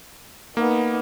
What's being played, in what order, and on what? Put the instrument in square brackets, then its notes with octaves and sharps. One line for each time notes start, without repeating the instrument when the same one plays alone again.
[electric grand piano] A#3 [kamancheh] B3 D#4